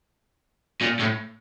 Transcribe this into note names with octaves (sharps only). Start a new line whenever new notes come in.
A#2
A2